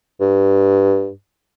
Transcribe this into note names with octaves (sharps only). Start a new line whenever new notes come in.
G2